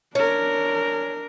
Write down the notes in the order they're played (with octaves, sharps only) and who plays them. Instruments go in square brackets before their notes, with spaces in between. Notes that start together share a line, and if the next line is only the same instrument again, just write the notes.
[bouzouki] C#4 [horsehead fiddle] D4 A#4